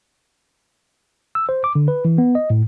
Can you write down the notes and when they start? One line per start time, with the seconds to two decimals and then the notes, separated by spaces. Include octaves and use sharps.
1.35 E6
1.49 C5
1.64 D6
1.75 D3
1.88 B4
2.05 E3
2.18 B3
2.35 D#5
2.50 A2